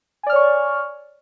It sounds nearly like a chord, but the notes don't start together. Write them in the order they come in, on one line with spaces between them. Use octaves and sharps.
G#5 D5 F6 C#5 C#6